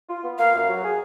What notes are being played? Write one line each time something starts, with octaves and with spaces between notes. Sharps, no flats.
F4
B3
A#3 F5
F#2
F#3
G#4